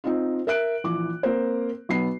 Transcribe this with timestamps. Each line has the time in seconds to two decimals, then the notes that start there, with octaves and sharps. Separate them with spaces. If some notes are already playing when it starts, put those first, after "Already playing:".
0.04 C4 D#4 F4
0.47 A#4 E5 F#6 D7
0.84 A#1 E3 D6
1.23 A#3 C4 A#4 C5
1.89 B1 B3 C7